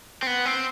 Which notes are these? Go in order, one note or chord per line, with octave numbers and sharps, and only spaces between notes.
C4
B3
C4